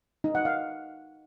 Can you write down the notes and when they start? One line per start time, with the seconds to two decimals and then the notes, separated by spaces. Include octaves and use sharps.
0.24 D#4
0.35 F#5
0.45 F5